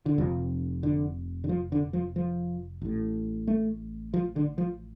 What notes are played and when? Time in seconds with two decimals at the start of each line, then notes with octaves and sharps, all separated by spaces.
0.06 D3
0.18 F1 F2 C3 F3
0.83 D3
1.44 D3
1.49 F3
1.72 D3
1.93 F3
2.16 F3
2.82 A1 A2
3.48 A3
4.14 F3
4.36 D3
4.58 F3